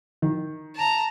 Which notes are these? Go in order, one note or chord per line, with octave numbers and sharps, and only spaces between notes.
D#3
A5 A#5